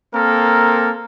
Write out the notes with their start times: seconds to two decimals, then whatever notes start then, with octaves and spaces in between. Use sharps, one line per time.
0.14 A#3 C4 A4 A#4